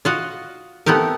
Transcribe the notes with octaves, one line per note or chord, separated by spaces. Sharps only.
F4 F#4 D#5
A3 B3 C4 G4 A#4